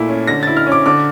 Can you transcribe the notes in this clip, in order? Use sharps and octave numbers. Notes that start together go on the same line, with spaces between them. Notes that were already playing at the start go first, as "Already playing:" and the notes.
Already playing: A#2 A3 E4
C#4
D3 A#6
E4 A6
F6
C#4
D6
D3 D6